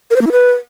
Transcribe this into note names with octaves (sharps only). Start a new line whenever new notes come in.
A#4
C5
A#3
E4
B4